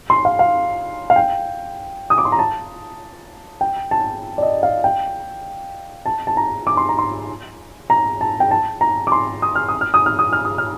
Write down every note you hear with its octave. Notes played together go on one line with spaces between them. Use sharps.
C6
F5
F5
F5
G5
D#6
D6
C6
A#5
A5
G5
A5
D5
D#5
F5
G5
A5
A5
A#5
D6
C6
A#5
C6
A#5
A5
G5
A5
A#5
D6
C6
D#6
F6
D#6
F6
D#6
F6
D#6
F6
D#6
F6